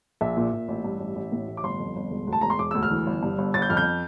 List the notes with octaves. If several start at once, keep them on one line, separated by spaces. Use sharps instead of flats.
A#1 E5
A#2
A#2
A1
G2
A1
A1
A2
A1
D6
G1 C6
F2
G1
E1
D2
A5
E1 A#5
C6
E1 D6
D2 E6
F6
E3
G1
G2
G1
G1 A6
G6
F2 F6
G6